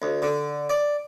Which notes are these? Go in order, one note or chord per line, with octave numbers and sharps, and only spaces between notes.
D2
D3
D5